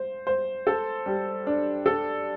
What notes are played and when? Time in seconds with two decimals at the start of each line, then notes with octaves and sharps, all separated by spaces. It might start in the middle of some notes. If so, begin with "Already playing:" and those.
Already playing: C5
0.27 C5
0.67 A4
1.06 G3
1.47 D4
1.86 A4